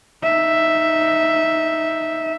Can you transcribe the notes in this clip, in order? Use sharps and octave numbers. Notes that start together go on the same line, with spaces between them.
D#4 E5